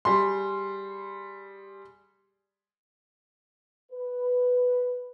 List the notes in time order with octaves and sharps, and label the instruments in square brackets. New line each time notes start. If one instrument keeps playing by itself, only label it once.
[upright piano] G3 G#4 C6
[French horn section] B4